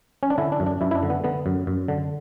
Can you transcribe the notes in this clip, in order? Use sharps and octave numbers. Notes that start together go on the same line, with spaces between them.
C#4
D4
D3 E4
D4
F#2
D4
F#2 E4
E4
D4
D3
B3
D3 B3
F#2
F#2
D3